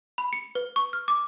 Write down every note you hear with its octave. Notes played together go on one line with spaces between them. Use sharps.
B5
C#7
B4
C#6
F6
D6